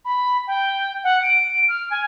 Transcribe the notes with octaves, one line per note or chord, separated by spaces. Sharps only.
B5
G5
F#5
D7
F6
G#5